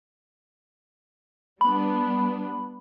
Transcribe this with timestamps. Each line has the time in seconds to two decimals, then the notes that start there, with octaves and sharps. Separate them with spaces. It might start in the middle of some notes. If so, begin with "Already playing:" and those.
1.61 G3 B3 D4 B5